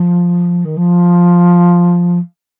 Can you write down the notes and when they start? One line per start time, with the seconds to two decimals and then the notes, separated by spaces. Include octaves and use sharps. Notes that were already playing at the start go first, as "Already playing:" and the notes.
Already playing: F3
0.64 D#3
0.77 F3